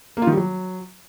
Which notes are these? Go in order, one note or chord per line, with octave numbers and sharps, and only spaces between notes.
A#3
F4
D#3
G3
F#3